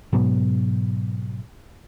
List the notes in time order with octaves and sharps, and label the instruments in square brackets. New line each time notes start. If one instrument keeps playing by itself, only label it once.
[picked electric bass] G#2 B2 F#3 B3